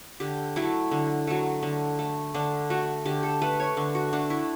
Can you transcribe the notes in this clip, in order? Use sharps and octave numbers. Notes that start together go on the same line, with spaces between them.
D3 G4
F#3 A3 E4
D3
F#3 A3
D3
A3
D3 D4
A3 F#4
D3 G4
A4
A3 B4
C#5
D3
F#4
A3 D4
E4